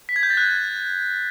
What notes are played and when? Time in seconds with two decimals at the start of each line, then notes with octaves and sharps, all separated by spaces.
0.09 B6
0.16 G#6
0.23 G6
0.30 A6
0.37 F#6